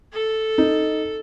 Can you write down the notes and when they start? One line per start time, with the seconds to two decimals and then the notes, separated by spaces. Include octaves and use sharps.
0.12 A4
0.58 D#4